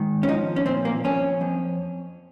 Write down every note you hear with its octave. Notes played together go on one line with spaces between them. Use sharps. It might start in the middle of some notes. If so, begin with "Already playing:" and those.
Already playing: G#2 D#3
C#4
F3 D#4
C#4
A#2 C4
A#3
F2 C#4
F2